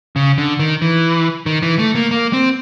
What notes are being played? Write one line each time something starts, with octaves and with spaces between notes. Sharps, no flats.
C#3
D3
D#3
E3
D#3
E3
A3
A#3
A#3
C4